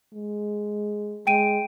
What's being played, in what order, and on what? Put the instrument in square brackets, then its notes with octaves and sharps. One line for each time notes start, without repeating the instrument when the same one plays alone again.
[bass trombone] G#3
[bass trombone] G#3 [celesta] G5 D7 D#7